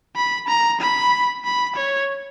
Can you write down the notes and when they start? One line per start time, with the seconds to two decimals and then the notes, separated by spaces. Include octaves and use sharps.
0.16 B5
0.48 A#5
0.81 B5
1.44 B5
1.76 C#5